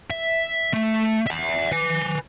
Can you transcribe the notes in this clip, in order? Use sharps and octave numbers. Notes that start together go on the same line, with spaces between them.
E5
A3
E5 F#5
B4 G#5